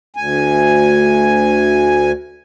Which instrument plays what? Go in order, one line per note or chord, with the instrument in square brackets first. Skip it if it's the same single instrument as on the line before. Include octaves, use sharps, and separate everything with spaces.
[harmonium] D2 G#5